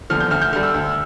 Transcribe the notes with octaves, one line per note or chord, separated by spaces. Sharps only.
E2 D3 F3 F6
G6
D2 F6
G6
D3 G3 F6
E6
D2